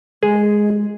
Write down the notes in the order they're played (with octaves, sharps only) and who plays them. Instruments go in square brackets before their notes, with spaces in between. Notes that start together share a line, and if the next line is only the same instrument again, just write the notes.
[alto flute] G#3 [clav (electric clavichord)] G#4